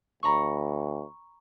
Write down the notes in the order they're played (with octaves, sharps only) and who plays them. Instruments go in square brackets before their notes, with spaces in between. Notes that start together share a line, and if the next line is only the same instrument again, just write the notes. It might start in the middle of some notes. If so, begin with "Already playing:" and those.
[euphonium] D2 [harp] A#5 B5 C#6